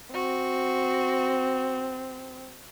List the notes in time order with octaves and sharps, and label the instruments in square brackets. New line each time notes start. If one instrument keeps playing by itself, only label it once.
[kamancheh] C4 [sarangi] F#4